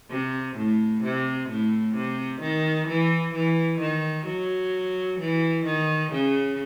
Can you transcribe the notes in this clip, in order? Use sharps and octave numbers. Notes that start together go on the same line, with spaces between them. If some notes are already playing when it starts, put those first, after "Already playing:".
C3
A2
C3
A2
C3
D#3
E3
E3
D#3
F#3
E3
D#3
C#3